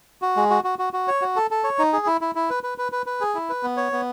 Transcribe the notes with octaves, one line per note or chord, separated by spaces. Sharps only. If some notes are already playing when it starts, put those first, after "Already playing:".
F#4
G#3
F#4
F#4
F#4
F#4
C#5
F#4
A4
A4
C#5
D#4
G#4
E4
E4
E4
B4
B4
B4
B4
B4
G#4
E4
B4
B3
C#5
B3